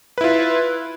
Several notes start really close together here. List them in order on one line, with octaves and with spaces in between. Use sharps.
B4 E4 F4